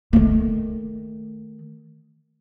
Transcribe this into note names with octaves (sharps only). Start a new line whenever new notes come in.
D#3 A3